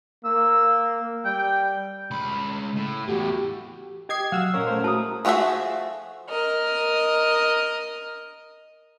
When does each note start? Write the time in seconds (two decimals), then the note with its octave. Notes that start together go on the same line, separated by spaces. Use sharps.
0.25 A#3 E6
1.25 G3 G5
2.11 C#2 B5
2.76 A2
3.08 E2 A2 F#4 G4
4.09 G4 D#5 D#6 G#6 C7
4.32 F#3 F#4 F5 E6
4.54 A#2 C#4 A#4 C#5
4.67 A3 C5
4.84 E4 F#4 G#4 A5 A#5 D#6
5.25 F3 A3 F#4 G#4 E5
6.29 A#4 D#5 F6